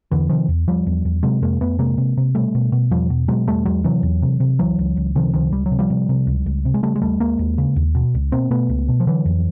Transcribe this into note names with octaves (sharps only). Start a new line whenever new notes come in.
E2 D3 E3
C3 D#3 F3
E2
E2 F3 G3
E2
E2
C3 F#3 G#3
F2 G#3 A#3
F2 A3 B3
C3 G#3 A#3
C3
C3
B2 G3 A3
B2
B2
E2 F3 G3
B2
B2 F#3 G#3
E2 G3 A3
E2 F#3 G#3
C3 E3 F#3
E2
C3
C3
C#2 E3 F#3
C#2
C#2
C3 D#3 F3
C#2 D#3 F3
C#2 G3
F#3
C3
F3 G3
C3
C3
C#2
C#2
C3
G#3
C#3 G3 A3
G#3
D#2 G3 A3
D#2 G#3 A#3
D#2
C#3
D#2
B2
C#2
B2 A#3 C4
B2 A3 B3
C#2
B2
F3
D3 E3 F#3
F2